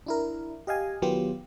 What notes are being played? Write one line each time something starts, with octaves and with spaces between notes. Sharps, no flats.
D4 E4 A#4
G4 D#5 F5 G#5
D#3 F#3 B3 F4 G4